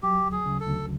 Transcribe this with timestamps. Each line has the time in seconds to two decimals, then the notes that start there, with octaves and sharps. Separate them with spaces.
0.03 F#3 G4
0.25 D2
0.32 G#4
0.46 C#3
0.60 A4
0.67 D2